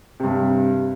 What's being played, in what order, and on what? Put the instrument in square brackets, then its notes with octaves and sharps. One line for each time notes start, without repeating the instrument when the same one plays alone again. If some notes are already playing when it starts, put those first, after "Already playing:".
[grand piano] G2 C3